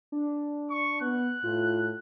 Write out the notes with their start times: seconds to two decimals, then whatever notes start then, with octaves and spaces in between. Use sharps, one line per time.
0.12 D4
0.70 C#6
1.01 B3 F#6
1.44 A2 F4